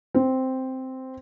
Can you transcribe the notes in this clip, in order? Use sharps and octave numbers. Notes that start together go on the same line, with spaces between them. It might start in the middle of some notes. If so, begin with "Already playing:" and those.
C4